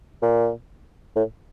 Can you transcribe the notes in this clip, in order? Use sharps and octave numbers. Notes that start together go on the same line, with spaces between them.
A#2
A2